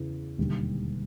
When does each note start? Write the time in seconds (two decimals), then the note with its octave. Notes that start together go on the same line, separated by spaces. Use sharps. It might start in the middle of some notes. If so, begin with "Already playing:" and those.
Already playing: E2 C#3 E3
0.38 E1 D#2 D3 G3